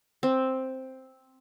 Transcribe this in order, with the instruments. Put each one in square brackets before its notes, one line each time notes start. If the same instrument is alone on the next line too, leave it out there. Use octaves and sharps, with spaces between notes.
[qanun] C4